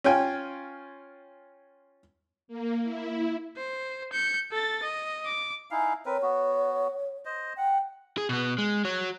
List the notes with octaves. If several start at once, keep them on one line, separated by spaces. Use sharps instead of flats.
C#4 F4 G5 G#5
A#3
E4
C5
G6 C#7
A4 A6
D#5
D6
D#4 E4 F5 G#5
C4 A#4 B4 C#5
B3 F#4
C5 D#5
F#5 G5
G#4
B2 B3
G#3
F#4 C#5